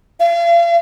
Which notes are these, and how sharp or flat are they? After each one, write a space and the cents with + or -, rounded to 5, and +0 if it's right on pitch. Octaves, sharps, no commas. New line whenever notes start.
F5 -40